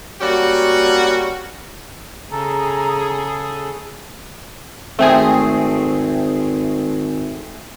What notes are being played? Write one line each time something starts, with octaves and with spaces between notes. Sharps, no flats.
G3 A#3 C#4 F#4
C#3 G#4 A4 A#5
G#1 A3 C4 G#4